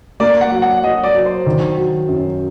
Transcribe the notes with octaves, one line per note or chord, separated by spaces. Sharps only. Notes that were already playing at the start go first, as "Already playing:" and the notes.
A#3 D5
F#5
F#3
F#5
F#3 D#5
D5
F#3
C5
D#3
F#3
F#2